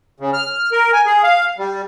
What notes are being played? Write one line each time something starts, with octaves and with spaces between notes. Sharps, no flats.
C#3
F6
F6
A#4
G#5
G#4
F5
G3